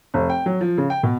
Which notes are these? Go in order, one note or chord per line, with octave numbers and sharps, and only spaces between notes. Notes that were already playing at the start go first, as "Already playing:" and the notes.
F1
G5
F#3
F3
C#3
G5
B2